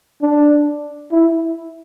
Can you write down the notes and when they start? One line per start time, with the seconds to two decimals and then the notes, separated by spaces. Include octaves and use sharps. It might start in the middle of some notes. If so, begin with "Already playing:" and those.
0.22 D4
1.12 E4